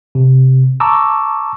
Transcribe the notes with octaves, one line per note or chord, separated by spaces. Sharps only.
C3
A5 A#5 C#6 D6 E6